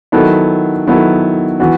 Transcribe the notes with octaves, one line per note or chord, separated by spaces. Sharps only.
D#3 F#3 B3 E4 A4
D#3 F#3 B3 E4 A4
E3 B3 F#4